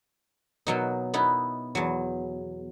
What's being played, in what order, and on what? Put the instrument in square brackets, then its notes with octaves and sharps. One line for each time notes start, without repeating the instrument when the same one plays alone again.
[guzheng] B2 F#3 D#4
B3 D#4 E4
E2 F#3